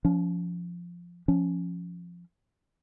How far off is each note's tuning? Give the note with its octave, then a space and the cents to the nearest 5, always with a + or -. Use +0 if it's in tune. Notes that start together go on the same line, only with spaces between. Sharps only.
F3 +0 C#4 +35
F3 +0 C#4 +0